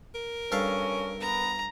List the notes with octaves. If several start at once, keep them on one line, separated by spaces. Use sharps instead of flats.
A#4
G2 C#4 A4 F5
B3 A#5